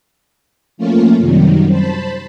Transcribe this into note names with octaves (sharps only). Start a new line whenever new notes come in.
F3 A3 A#3 C#4 F4
F#2 C3 D#3 F#3 G3
C5 A5 B5